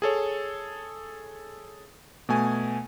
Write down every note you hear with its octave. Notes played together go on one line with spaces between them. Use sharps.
G#4 A4 C#5
B2 A3 G#5